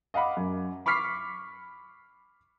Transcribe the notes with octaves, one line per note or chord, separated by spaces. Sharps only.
D#5 F5 F#5 B5 D6
F#2
B5 C#6 D6 F6 B6 C7